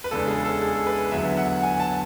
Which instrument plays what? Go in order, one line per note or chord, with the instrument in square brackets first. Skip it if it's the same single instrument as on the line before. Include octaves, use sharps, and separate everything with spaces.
[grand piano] B4
E2 C#3 G#3 D4 A4
G#4
A4
G#4
A4
B4
E2 D3 F#3 B3 E5
F#5
G#5
A5